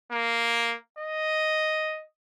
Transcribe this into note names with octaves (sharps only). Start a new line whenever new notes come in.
A#3
D#5